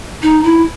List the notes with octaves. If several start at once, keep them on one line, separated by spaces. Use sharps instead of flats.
D#4
E4